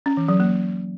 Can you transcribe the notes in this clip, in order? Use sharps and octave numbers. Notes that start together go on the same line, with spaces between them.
C#4
E3
F#3
A#3